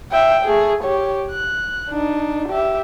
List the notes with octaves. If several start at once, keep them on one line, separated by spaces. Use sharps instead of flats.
E5 G5
A3 G#4
G4 C#5
F#6
D4 D#4
G4 E5